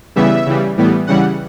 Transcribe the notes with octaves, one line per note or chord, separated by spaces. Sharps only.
C#3 E3 G3 B3 E5
C#3 E3 G3
A2 E3 G3 B3
C#3 E3 G3 F#5